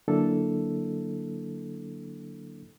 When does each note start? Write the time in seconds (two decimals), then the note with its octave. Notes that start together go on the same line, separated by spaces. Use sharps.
0.08 D3 F#3 A#3 D4 E4 A4